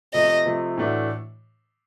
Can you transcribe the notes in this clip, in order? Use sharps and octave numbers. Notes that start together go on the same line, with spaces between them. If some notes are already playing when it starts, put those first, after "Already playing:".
C3 F3 A3 D#5
C3 F3 A3
A2 E3 A3 D4 F#4